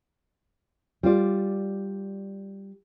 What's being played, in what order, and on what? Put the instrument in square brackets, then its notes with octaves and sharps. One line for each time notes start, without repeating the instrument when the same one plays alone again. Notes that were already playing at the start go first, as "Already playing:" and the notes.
[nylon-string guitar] G3 F4 D5